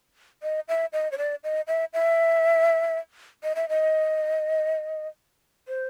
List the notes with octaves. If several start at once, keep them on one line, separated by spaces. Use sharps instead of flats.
D#5
E5
D#5
C#5
D5
D#5
E5
E5
D#5
E5
D#5
C5